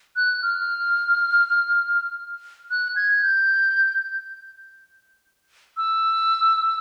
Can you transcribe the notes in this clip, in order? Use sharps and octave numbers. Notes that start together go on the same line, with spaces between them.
F#6
F6
F#6
G#6
G6
E6